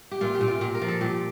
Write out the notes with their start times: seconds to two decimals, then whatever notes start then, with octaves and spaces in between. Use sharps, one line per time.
0.11 G4
0.21 A#2 F4
0.35 G4
0.41 A#2
0.47 F4
0.61 A#2 G4
0.75 A#4
0.81 F3
0.88 A4
1.01 A#2 G4